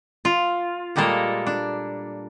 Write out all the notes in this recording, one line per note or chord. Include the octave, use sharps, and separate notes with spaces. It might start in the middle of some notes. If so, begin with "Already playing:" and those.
F4
A#2 G3 G#3 A#3 A4 A#4
D4